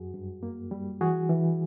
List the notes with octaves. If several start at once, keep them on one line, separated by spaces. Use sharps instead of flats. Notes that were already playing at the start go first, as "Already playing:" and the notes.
Already playing: F#2 F#4 G#4
G2
A#3
G3
E3 F#4 G#4
E3